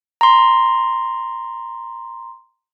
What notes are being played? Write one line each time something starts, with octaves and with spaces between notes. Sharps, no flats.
A#5 C6